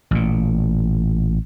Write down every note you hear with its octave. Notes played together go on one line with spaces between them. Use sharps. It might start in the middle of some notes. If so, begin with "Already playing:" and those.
A1 A#2